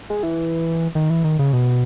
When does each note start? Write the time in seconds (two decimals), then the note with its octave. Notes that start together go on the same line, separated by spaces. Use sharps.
0.10 G#3
0.23 E3
0.95 D#3
1.10 E3
1.24 D#3
1.39 C#3
1.53 B2